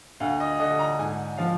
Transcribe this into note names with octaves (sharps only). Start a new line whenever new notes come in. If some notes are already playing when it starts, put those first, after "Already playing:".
D2 F5
D#5
D3 D#5
A#5
G#2 G#5
F3 F5